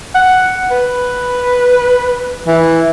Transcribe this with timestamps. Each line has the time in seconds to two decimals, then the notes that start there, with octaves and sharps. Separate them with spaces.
0.15 F#5
0.71 B4
2.47 E3